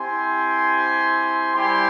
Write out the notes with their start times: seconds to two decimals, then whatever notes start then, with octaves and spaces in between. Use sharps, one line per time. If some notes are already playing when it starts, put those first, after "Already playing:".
Already playing: C4 E4 G4 G#5 C6
1.55 G3 C4 E4 G4 G#5 C6